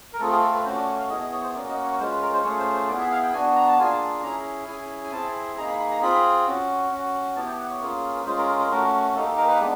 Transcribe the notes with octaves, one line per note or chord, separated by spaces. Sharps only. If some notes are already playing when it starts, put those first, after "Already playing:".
A#4
A3 C4 F4 G#4 A4
G#4
A4
B4
A3 C#4 F#4 C5
D5
C#5
F5
B3 E4 G#4 D#5
D#5
C#5
C5
A#3 C#4 F#4 D5
D#5
C#5
G#3 C#4 F4 C5
B4
A#4
C5
A3 C#4 F4 G#4 C#5
C5
C5
B3 E4 G#4 D5
E5
F5
G5
B3 D4 F#4 G#5
A#5
A5
A#3 D4 F4 G#4 G#5
A5
C#4 E4 G#4 A#5
C#4 E4 G#4 G#5
G#5
C4 E4 G#4 A5
A#3 D#4 G#4 A#5
B5
B5
A#5
C4 F4 G#4 B5
C#4 F#4
C#4 F#4
B3 E4 G4 A5
G5
F#5
C#5
A#3 C#4 F4 G#4
B4
G#3 C#4 F4 G#4 C5
A#4
A#4
A#4
A3 C#4 F#4 A#4
A#3 D#4 G4 A4
A4
A#4
B4
G#3 B3 D4